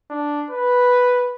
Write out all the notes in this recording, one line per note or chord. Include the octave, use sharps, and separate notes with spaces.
D4
B4